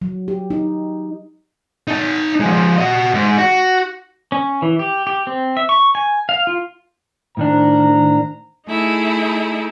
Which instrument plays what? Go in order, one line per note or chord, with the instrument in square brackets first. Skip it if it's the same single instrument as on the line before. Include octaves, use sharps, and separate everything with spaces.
[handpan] F#3
G4
D#4
[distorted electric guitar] D#4 A5
F3 G#3
F#4 D#5
G#2
F#4
[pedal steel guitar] C#4
E3
G4
G4
C4
E5
C#6
G#5
F5
F4
[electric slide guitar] A2 D#3 D4 [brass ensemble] C5 A#5
[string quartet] A3 D#4 E4 G#4